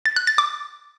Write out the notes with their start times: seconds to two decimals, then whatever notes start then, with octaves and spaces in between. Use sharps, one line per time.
0.06 A6
0.16 F#6
0.27 A6
0.38 D6